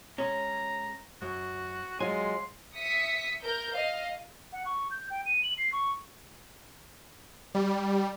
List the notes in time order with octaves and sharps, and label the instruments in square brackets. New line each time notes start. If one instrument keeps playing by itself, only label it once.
[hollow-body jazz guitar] G#3 C#4 [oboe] A#5
[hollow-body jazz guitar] F#2 [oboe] F#4
[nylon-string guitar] F#3 F4 [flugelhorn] G#3 [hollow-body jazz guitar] G#5 [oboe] C6
[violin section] E5 D#6 B6 C#7
A#4 G6
D#5 F5
[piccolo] F#5
C#6
G6
G5
D#7
F#7
C7
C#6
[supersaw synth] G3